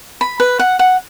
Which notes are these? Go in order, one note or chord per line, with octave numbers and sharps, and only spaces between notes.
B5
B4
F#5
F#5